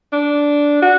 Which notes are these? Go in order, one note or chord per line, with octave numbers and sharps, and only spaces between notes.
D4
F#4